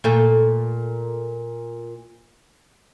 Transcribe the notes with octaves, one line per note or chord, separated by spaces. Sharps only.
A#2 A3